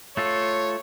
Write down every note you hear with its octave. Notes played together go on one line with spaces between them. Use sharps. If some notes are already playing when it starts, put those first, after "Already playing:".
A3 F4 A4 C#5